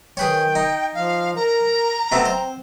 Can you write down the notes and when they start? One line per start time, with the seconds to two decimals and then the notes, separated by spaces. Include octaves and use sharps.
0.17 D#3 G#4 B4 C#5 G5
0.55 D#4
0.95 F3 F5
1.36 A#4 A#5
2.12 B2 A3 C4
2.26 C4 C5